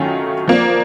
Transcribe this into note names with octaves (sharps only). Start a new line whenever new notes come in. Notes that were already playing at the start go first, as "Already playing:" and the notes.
Already playing: D#3 F#3 A3 C#4 F4
F3 A#3 D4